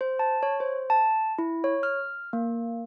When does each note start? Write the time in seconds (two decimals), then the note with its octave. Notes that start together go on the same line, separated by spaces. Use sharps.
0.01 C5
0.19 A5
0.43 C#5
0.60 C5
0.90 A5
1.38 E4
1.64 C#5
1.83 F6
2.33 A#3